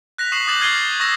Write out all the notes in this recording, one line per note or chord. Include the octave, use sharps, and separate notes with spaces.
F#6 A#6 B6 F7
C#6 D#6 C7 E7 F#7
D6 D#6 G6 A6 E7 F#7
F6 G#6 C7 D#7 G7
C#6 D#6 E6 G6 A#6 E7